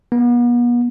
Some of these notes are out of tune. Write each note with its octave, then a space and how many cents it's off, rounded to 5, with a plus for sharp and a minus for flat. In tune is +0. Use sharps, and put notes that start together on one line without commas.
B3 -40